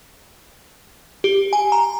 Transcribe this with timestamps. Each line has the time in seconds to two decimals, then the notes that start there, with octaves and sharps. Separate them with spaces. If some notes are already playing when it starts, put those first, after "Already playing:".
1.24 G4
1.53 G#5
1.72 A#5